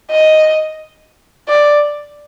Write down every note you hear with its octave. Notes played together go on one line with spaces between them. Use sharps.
D#5
D5